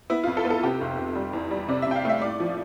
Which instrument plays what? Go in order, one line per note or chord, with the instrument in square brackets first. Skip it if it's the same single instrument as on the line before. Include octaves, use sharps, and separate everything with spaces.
[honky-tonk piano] B3 E4
F2 F4
A4
B3
A4
C3 G4
F1
F1
G3
E2
G3
C3 D5
E5
C3 G5
F5
A3 E5
A2 D5
F3